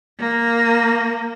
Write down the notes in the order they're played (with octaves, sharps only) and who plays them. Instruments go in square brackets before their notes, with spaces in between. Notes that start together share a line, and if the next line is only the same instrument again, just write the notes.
[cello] A#3